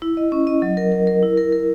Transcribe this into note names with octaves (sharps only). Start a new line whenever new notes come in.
E4
D#5
C#4
D#5
F#3
A#4
A#4
A#4
E4
A#4
A#4